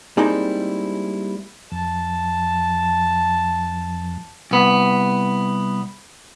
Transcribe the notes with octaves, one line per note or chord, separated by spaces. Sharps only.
G3 G#3 A#3 C4 D#4 E4
F2 A5
C2 B3